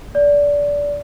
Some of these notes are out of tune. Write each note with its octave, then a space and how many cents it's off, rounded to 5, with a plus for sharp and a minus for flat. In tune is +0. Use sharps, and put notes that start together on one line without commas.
D5 -20